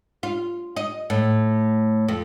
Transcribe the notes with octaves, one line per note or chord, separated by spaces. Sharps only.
F4
D#5
A2
F2